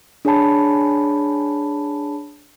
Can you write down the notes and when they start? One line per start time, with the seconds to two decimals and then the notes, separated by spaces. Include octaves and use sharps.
0.25 D4 G#4 C#5 G#5 A5 B5